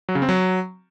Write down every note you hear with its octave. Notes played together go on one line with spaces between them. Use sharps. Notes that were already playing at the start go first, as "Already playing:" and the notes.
F#3
C#3
C4
F#3